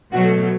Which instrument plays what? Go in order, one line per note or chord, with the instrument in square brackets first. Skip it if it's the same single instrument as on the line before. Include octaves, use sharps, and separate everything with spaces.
[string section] B2 F#3 A3 F#4